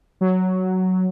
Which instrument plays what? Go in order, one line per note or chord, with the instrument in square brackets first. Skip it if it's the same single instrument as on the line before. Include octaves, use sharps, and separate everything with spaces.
[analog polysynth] F#3